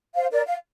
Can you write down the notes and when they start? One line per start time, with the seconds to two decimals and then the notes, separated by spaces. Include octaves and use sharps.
0.15 C5 F5
0.31 A#4 D5
0.46 F5